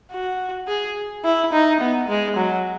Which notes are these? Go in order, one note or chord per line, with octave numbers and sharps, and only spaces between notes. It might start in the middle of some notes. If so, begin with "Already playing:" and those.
F#4
G#4
E4
D#4
B3
G#3
F#3